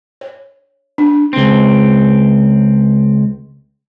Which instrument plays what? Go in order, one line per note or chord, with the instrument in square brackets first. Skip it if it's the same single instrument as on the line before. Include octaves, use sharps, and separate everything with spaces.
[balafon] C#5
D4
[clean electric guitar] C#2 C4